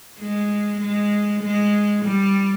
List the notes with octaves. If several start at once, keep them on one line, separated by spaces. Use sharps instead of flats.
G#3
G#3
G#3
G3